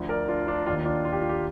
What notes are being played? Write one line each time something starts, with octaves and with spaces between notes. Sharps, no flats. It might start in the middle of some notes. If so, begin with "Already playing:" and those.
Already playing: D2 D3 F3
A#4 D5
D4 F4
D4 F4
D#2 D#3 D4 F4
D4 F4
F4
G4
F4
G4